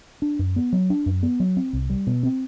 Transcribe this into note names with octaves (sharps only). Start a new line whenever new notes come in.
D4
F#2
B3
F#3
D4
F#2
B3
F#3
C4
C2
G3
B2
C4